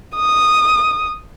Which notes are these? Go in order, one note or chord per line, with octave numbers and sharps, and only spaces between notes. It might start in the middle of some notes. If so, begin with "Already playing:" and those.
D#6